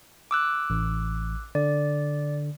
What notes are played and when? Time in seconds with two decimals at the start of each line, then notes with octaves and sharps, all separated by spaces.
0.31 D6 E6 F#6
0.70 A1
1.55 D3 D5